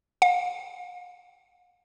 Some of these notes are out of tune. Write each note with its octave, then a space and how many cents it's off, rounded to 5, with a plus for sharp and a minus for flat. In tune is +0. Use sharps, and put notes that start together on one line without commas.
F5 +45